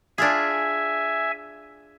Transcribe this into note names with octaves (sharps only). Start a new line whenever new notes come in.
D4 F4 G#4 E5 G#5